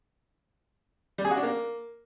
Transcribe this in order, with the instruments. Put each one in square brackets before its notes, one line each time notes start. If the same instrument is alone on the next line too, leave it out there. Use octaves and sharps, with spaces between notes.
[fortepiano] G3
G#4
F#4
D4
A#3